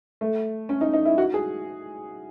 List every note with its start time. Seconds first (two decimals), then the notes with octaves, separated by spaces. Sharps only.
0.21 A3
0.69 C#4
0.81 D#4
0.94 D#4
1.06 E4
1.18 F#4
1.34 G#4